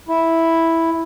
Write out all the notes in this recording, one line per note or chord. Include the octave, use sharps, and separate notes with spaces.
E4